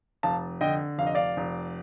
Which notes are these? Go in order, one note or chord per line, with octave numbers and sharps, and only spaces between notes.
F1 F5 A5
D3 D#5 G5
F1 F5
D#5
D5 F5
F1